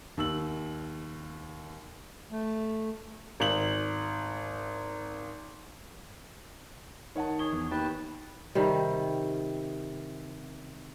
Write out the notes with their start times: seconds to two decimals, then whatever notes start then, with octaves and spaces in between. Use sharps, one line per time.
0.17 D#2 E6 F#7
2.31 A3
3.40 G#1 F#7
7.16 D#3 C#5 F#5 A5
7.39 G#4 C#5 G7
7.52 E2
7.71 D#2 B4 G5 A5
8.55 C3 D#3 G3